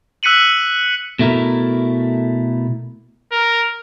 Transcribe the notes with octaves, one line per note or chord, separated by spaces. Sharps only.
E6 F#6 B6 C#7 D#7 F#7
B2 A3 E4 A#4
A#4